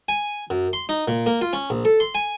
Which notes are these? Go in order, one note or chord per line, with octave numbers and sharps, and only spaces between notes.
G#5
F#2
C6
D#4
A#2
A#3
F4
C#4
A#1
A4
C6
G#5